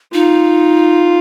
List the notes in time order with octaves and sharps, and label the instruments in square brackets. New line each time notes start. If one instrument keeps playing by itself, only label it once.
[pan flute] D#4 [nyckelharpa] F4